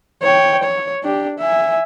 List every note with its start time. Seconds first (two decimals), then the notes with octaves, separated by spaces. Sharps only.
0.23 C#5 G5
0.63 C#5
1.03 D4 G4
1.39 E5 G#5